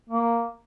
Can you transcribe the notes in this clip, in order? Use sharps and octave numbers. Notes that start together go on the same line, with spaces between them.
A#3